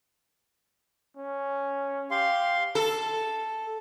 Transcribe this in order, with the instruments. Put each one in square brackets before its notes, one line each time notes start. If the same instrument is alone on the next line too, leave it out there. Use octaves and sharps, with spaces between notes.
[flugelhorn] C#4
[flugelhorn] G4 [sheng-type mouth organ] F5 C6
[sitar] A4